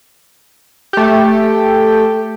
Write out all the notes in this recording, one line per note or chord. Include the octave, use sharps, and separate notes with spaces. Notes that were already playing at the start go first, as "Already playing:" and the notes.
A3 G4